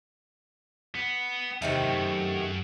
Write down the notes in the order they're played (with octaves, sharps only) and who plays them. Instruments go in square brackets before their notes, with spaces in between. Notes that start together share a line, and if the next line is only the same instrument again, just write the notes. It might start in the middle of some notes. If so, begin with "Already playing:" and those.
[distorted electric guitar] B3
[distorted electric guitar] E2 [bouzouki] C3 D#3 A3
[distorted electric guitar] F#2